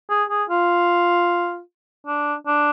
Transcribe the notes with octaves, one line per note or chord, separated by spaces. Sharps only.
G#4
G#4
F4
D4
D4